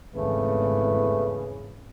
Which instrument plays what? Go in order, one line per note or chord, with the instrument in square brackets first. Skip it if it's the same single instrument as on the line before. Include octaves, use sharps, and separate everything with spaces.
[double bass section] G#1 E2 [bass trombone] C#3 [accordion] A3 [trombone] B4